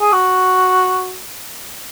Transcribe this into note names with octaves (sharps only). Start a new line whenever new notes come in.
G#4
F#4